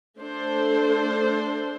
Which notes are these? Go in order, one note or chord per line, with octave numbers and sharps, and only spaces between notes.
A3 D4 A4 C5